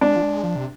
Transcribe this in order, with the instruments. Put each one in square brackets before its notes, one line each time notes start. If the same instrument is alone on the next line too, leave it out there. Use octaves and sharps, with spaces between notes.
[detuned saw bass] G#3 [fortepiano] D4
[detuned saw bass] F3
G#3
F3
C3